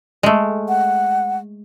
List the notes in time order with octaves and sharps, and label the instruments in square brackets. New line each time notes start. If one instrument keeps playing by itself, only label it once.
[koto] G#3 A3
[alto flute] F#5